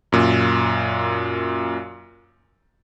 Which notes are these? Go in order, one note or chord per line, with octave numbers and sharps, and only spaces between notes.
F#2 A#2